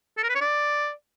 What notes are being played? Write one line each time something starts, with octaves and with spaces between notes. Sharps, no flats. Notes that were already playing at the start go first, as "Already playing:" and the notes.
A4
A#4
B4
C#5
D5